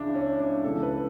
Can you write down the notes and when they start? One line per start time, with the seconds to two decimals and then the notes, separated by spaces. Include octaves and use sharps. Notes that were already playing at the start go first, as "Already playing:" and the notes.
Already playing: C#2 C#3 E3 D4 E4
0.15 C#4
0.40 D4
0.63 C#2 C#3 E3 A4
0.83 B4